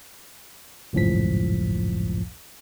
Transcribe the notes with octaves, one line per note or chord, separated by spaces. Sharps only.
G#1 C#2 F#2 A2 F3 B6